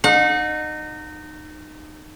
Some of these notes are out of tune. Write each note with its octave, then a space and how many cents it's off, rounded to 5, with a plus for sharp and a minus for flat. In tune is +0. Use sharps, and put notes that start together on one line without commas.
D#4 -25 F#5 -35